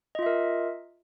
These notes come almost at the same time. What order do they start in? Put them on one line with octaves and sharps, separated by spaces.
D#5 F4 E5 A#4